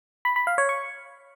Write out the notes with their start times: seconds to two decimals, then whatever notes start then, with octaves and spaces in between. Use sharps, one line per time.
0.25 B5
0.36 B5
0.47 F5
0.58 C#5
0.69 C#6